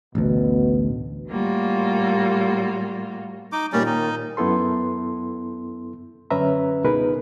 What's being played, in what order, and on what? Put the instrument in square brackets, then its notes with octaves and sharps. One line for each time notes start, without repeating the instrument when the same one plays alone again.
[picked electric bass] A1 D2 [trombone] B2
[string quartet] A2 G3 A#3 F4 F#4
[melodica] D#4 D6
[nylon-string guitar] D#2 A#2 D#3 [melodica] G3 C#4 D5
[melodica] D#4
[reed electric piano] F#2 B3 E4 A4 C6
F#2 D3 C#4 B4 E5 A#5
C#2 B2 D#4 G#4 A#4 B4